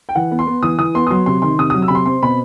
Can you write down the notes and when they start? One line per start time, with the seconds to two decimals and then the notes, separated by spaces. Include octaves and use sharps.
0.09 G5
0.15 E3 F#5
0.31 B3
0.39 C6
0.47 B3
0.63 E3 D#6
0.78 E3 D#6
0.95 B3 C6
1.07 D#6
1.11 F#3 C6
1.26 C3 C6
1.42 D#3 C6
1.59 C3 D#6
1.70 F#3 D#6
1.82 E6
1.88 C3 B5
1.95 C6
2.06 C4 C6
2.23 B2 B5